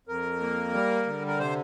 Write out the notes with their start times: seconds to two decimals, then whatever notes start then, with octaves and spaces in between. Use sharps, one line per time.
0.07 F2 A#4
0.41 A#3
0.73 G3
1.06 D3
1.27 A#4
1.39 C3 C5